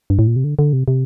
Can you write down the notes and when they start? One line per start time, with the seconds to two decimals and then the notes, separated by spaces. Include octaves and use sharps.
0.10 G2
0.19 A2
0.27 A#2
0.36 C3
0.44 D3
0.59 D3
0.73 C3
0.88 C3